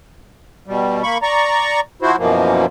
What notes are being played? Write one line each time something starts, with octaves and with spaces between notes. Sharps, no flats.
B2 G3
A#3 B5 C#6
D5 A#5 C#6
F3 E4 F#4 C5
F#2 B2 E3 F3 A#3